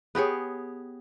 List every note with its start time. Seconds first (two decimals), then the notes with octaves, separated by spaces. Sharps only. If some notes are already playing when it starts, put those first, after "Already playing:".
0.15 B3 G4 G#4 C#5